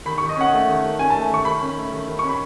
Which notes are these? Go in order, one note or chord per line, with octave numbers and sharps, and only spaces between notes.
D#3 B5
D#3 C#6
D#5
C#4 F#5
A3
D#3
D#3
C#4 G#5
A3 A5
D#3 C#6
D#3 B5
C#4
A3
D#3
D#3
C#4 C#6
B5